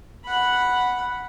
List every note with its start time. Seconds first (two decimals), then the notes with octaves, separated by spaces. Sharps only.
0.24 F#5 B5